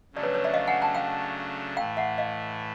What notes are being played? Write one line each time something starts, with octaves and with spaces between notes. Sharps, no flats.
C#3 F#3 A3 D4 D5
B4 C#5
B4 C#5
D5 E5
D#5 F5
F#5 G#5
G5 A5
F5 G5
A2 E3 A3 F5 G5
E5 F#5
D#5 F5